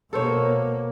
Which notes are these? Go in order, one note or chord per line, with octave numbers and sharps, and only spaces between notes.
B2 A#3 A4 C5 C#5